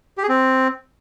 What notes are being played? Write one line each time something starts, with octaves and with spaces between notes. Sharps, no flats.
G4
G#4
C4